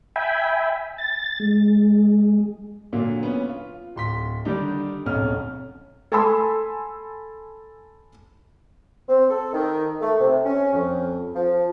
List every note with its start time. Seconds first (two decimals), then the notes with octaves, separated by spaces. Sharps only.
0.16 E5 G5 G#5 B5
0.98 A6
1.40 G#3
2.93 A#2 D3 F#3 A#3
3.23 B3 C#4
3.49 F4
3.96 D1 C6 B6
4.45 D3 D#3 G3 D4 D#4
5.06 D1 B1 F2 C#4 F6
6.12 A4 G#5 A5 B5 C6 E6
9.08 C4
9.30 A4
9.53 D#3
10.02 A3
10.20 C3
10.46 C#4
10.73 F2
11.35 F3